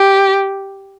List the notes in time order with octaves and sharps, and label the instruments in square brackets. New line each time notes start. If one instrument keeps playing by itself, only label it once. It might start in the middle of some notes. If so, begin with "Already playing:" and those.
Already playing: [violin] G4